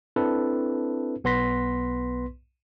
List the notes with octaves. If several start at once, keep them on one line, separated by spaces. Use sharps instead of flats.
C4 D4 E4 A4 B4
B1 B3 B4 C6 A#6 B6